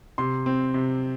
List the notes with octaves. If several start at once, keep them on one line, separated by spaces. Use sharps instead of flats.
C3 C6
C4
C3